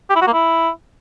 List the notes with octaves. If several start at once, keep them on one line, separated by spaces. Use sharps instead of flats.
G4
E4
F#4
A#3
E4